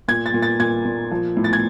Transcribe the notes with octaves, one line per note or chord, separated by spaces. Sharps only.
A#2 G#6
A6
A#2
A6
A#2 G#6
A#2
F3
A2
A6
G#6